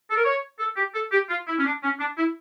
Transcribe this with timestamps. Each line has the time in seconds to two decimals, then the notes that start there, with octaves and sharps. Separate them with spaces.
0.10 A4
0.17 A#4
0.25 C#5
0.59 A4
0.76 G4
0.94 A4
1.11 G4
1.29 F4
1.47 E4
1.58 C#4
1.65 D4
1.83 C#4
1.99 D4
2.17 E4